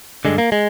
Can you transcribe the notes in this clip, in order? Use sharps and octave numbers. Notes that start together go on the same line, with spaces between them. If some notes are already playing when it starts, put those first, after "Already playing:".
G2 D3 G#3
A#3
G#3